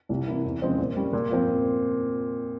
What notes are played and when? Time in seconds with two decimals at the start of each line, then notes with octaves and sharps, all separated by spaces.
0.09 C2
0.26 C3 E3 A#3 E4
0.45 E2
0.62 C#3 F3 G#3 C4
0.78 A#2
0.96 G3 C#4
1.13 A#2
1.30 F3 C4 F4